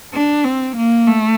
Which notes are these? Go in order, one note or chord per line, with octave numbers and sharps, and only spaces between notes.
D4
C4
A#3
A3